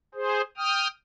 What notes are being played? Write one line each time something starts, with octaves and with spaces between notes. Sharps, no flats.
G#4 C5
G5 D#6 F6